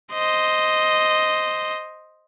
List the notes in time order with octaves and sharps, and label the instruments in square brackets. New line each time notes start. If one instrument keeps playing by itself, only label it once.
[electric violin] C5 D#5